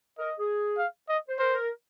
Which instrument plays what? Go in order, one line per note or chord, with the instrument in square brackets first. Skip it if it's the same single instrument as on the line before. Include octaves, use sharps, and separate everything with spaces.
[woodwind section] A#4 [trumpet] D#5
[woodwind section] G#4
[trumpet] F5
D#5
[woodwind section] C5
[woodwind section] A#4 [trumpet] C5
[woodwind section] A#4